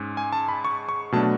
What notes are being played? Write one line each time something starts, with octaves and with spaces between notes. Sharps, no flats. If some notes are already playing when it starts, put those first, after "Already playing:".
Already playing: G#2 G#3 C#4
G#5
A5
B5
C#6
C#6
B2 F#3 A3 D4 A5